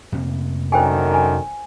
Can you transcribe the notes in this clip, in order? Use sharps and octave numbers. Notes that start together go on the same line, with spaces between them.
F2 C3 A#3
F#2 D3 D#3 C5 G5 G#5
G#5